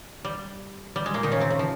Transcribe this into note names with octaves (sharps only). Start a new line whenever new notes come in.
G3
G3
G#3
A#2 A#3
D#3 D#4
C#3 C#4
C3 C4
C#3
F3